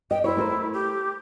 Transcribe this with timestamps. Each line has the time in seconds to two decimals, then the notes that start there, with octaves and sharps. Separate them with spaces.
0.11 D#5 G5
0.24 E4 C5 C#5
0.37 A3 A#4 C5
0.73 G4